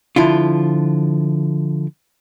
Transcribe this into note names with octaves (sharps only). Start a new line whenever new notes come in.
D3 F3 E4 F4